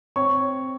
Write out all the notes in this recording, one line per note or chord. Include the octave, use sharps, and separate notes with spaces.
C4 C#5 C#6